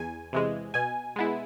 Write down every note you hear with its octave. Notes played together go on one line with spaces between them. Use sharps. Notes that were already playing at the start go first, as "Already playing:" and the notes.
Already playing: E2 G#5
C3 E3 G#3
B2 G#5
G#3 B3 E4